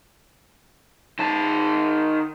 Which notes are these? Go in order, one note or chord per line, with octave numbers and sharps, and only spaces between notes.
D#3 A5